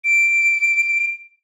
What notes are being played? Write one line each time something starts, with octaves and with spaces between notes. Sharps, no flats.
D7